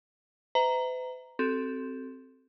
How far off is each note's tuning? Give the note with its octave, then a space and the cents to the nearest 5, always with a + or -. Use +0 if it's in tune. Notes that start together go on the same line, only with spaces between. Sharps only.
B4 +45 E5 -30 A#5 +0
C4 +0 F#4 +40 A4 +0